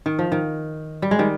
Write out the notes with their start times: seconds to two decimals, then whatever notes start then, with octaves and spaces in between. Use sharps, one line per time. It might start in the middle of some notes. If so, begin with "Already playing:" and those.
0.06 D#3
0.19 F3
0.32 D#3
1.02 G3
1.11 G#3
1.19 D#3 G3